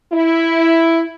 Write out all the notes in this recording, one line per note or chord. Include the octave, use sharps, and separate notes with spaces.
E4